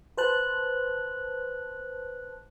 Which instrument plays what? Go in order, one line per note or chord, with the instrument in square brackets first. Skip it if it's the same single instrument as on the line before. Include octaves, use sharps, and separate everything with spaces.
[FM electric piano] B4 C5 A5 F#6